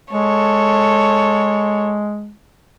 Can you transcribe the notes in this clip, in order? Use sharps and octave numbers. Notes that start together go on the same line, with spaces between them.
G#3 A4 C#5